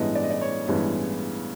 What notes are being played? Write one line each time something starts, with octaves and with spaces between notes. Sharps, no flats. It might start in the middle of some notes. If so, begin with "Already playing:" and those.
Already playing: A1 G2 E3 G#3 B3 D#5
D5
D#5
D5
C#5
A1 G2 E3 G#3 B3